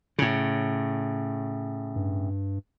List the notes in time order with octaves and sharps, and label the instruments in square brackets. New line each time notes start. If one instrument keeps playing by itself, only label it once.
[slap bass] A2 C#3
[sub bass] G2